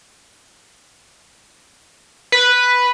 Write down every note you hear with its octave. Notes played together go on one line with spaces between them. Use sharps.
B4